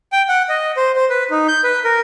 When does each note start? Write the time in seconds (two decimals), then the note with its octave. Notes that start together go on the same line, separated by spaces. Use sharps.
0.12 G5
0.29 F#5
0.49 D#5
0.77 C5
0.96 C5
1.10 B4
1.31 D#4
1.48 G6
1.64 B4
1.84 A#4